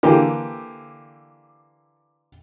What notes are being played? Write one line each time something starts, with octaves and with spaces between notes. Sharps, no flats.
D3 E3 A#3 G4